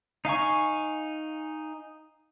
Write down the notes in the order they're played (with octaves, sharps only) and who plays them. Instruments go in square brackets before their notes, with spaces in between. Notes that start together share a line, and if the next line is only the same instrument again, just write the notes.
[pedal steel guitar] D#4 F5 G#5 C#6